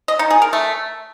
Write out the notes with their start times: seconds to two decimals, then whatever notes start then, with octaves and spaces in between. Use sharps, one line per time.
0.08 D#5
0.19 D#4
0.31 G#4
0.42 A#4
0.53 A3